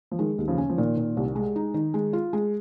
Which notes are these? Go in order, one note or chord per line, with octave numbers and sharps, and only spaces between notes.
F3
D#3 G#3
D#2
C#3 F3
C#4
F3
A#2 D#3
A#2
C2
G#3
D#4
D#3
G#3
F4
G#3